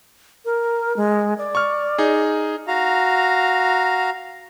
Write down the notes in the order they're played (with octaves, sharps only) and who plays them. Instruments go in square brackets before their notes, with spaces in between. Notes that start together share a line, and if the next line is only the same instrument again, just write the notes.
[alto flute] A#4
G#3
D5
[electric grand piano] C#6 F6
D#4 G#4
[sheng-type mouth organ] F#4 F5 A#5